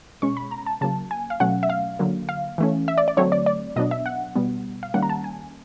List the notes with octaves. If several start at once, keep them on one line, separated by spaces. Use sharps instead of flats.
B2 G#3 C#4 C#6
B5
A#5
A5
C#3 F#3 A#3 A5
G#5
F5
B2 F#3 A3 C#4 F#5
E5
F5
D3 F#3 A#3
F5
E3 A3 C#4
E5
D5
D5
D3 F#3 A3 C4 C#5
D5
D5
B2 F#3 B3 D4 D#5
E5
F#5
B2 G3 B3
F5
D#3 G3 A#3 C#4 F#5
A#5
A5
G#5